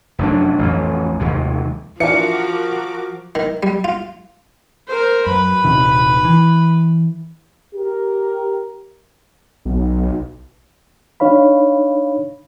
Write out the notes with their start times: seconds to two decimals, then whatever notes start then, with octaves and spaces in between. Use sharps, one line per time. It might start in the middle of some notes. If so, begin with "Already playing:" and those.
0.19 F1 F#2 F#3 D4
0.59 A1 F2
1.20 F1 D#2 C3 G#3
2.00 E3 F3 D4 F#4 A#4 D6 C#7
3.35 D#3
3.63 G3
3.84 F4
4.88 A#4 C5
5.27 F#2 B4 B5
5.64 D#1 C3 D#3
6.25 E3
7.76 G4 A#4
9.65 B1
11.20 D4 D#4 C#5 F5 B5